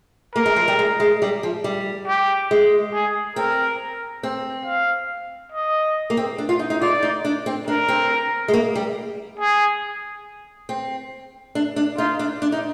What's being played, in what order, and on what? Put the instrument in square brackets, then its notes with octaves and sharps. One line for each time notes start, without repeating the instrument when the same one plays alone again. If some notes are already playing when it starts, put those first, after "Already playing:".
[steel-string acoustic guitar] A#3 [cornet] A#4
[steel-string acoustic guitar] G#3
F3
G3
G#3
G#3
G3
F3
G3
[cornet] G4
[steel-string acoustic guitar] G#3
[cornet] G#4
[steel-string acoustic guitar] C4 [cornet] A#4
[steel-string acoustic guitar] C4
[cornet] F5
D#5
[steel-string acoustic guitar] A#3
C4
D4
F4
D#4
D#4
[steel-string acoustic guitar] F4 [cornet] D5
[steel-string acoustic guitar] D#4
D4
C4
[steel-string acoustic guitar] D4 [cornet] A#4
[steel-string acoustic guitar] C4
G#3
A#3
G3
[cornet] G#4
[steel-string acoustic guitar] C4
D4
D4
[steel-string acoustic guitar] D#4 [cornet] F4
[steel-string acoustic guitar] D4
D4
D#4